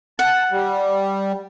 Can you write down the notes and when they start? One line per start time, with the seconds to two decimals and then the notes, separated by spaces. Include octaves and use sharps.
0.19 F#5 A5
0.51 G3